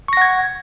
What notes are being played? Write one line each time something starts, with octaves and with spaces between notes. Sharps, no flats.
F#5 C#6 G#6 A#6